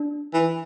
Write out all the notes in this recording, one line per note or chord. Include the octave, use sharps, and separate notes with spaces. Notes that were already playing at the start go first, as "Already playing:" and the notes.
Already playing: D4
E3